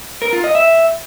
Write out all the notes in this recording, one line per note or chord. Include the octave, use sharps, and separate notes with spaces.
A#4
F4
D#5
E5